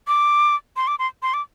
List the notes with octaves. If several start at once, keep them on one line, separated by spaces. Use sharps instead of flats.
D6
C6
D6
C6
C6
D6